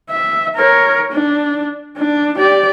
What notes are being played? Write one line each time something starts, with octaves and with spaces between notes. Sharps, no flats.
E5
A#4 C#5
D4
D4
G4 D5